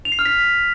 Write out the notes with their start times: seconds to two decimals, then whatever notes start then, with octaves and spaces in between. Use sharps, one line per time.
0.05 F7
0.12 C7
0.19 F6
0.25 B6